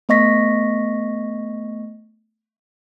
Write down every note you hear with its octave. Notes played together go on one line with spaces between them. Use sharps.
A3 B3 D#5 C#6 A#6 B6